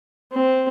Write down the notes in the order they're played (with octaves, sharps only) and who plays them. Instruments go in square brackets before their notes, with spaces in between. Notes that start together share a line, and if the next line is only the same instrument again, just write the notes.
[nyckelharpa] C4